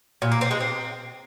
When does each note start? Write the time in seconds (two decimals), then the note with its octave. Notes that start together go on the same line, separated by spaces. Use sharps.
0.22 A#2
0.31 A#3
0.41 C4
0.51 G#3
0.60 C4